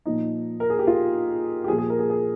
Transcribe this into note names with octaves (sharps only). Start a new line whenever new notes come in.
A#2 F3 D#4
A#4
G#4
G4
F4
G4
A#2 F3 G#4
G#4
A#4
G#4
G#4